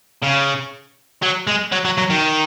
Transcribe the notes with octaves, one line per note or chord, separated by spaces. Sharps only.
C#3
F#3
G#3
F#3
F#3
F#3
D#3